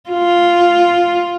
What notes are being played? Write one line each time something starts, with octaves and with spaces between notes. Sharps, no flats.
F4